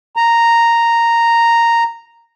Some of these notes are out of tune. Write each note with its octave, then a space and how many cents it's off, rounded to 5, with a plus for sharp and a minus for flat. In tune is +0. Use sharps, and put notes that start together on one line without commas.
A#5 -5